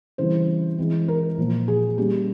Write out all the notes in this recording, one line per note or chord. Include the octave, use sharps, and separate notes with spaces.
C#3 E3 G3 C4 E4 C5
E3 G#3 C4 E4
A#4
A#2 F3 A#3
G#4
G3 A#3 C#4 G4